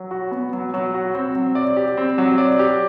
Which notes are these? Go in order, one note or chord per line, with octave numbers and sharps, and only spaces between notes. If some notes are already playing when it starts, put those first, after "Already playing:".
Already playing: F#3
F#4
B3
F#3
F#3
F#4
C4
F#3
D5
G4
C4
F#3
D5
G4